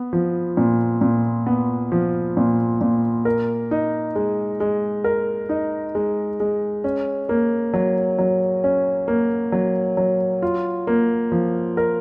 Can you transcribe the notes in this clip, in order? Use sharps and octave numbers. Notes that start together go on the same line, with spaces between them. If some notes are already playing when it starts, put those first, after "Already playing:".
Already playing: B3
F3
A#2
A#2
B3
F3
A#2
A#2
A#4
D#4
G#3
G#3
A#4
D#4
G#3
G#3
C#4
A#3
F#3
F#3
C#4
A#3
F#3
F#3
F4
A#3
F3
A#4